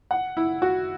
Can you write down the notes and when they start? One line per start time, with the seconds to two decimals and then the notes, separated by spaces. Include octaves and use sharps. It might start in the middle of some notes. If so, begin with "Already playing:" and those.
0.11 F#5
0.37 E4
0.62 F#4